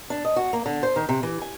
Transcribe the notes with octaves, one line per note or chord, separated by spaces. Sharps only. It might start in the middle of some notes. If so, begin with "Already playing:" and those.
D4
D#5
F#4
A#3
D3
C5
D#3
C3
E3
G#5